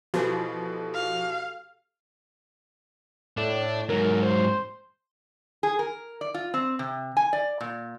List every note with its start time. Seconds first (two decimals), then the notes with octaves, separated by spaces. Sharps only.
0.14 B2 E3 F3 F#4 G4 A4
0.95 F5
3.37 A2 D4
3.89 G#2 F#3 A#4
4.23 C5
5.63 G#4
5.79 A#4
6.21 D5
6.34 F4
6.54 C4
6.79 C3
7.17 G#5
7.33 D5
7.61 A#2